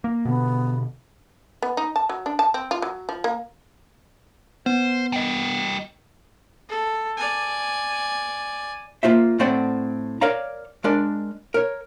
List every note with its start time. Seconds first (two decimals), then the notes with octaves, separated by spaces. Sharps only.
0.04 A#3
0.25 B2 D3 B3
1.62 B3
1.77 D#4
1.96 A5
2.09 F#3
2.26 D4
2.39 A5
2.54 C4
2.71 F4
2.82 F#3
3.09 F3
3.24 A#3
4.66 B3 C5
5.13 G3 D#5
6.69 A4
7.17 D5 G#5
9.03 A#3 F4 C5 E5
9.39 A2 A3 C4 C5 D5 F#5
10.21 A#4 C#5 D5 F5 A#5
10.84 G#3 D4 A#4 D5
11.54 A#4 C#5